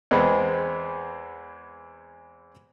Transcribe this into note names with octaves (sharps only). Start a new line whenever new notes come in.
E2 G#3 B3 C4